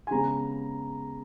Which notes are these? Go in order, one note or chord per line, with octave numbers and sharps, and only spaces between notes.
G#5
C#3 G#3 B3 A#5